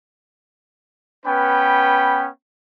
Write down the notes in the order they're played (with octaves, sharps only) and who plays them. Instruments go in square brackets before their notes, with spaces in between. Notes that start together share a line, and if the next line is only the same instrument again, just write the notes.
[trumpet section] B3 C#4 B4 G5 B5